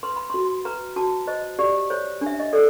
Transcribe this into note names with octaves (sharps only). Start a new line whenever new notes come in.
B4 C6
B5
F#4 C6
B4 A#5
F#4 A5
C5 D#5
G4 D5
C5 C#5
D4
E5
D#5
A4 D5